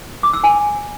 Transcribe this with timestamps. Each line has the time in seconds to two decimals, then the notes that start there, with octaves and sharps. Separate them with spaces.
0.23 D6
0.33 E6
0.44 G#5